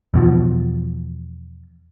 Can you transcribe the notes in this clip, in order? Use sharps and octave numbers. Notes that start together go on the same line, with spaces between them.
E2 B2 F3